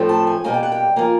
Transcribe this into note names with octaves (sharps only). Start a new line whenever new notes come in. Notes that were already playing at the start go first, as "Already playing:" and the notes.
Already playing: A2 F3 A3 C4
A5
G#5
B2 G3 A#3 G#5
G5
F#5
G5
F3 A#3 G#5